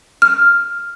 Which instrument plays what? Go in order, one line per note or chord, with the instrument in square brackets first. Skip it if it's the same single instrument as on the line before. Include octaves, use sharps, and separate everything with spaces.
[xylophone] F6